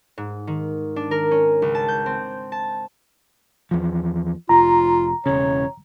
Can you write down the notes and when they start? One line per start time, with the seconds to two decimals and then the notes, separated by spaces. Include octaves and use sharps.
0.18 G#2
0.47 D#3
0.96 D4
1.11 A#4
1.31 C#4
1.62 C#2
1.75 A5
1.88 G6
2.06 C4
2.52 A5
3.71 E2 F3
4.49 F1 F4 A#5
5.26 E1 C#3 C#5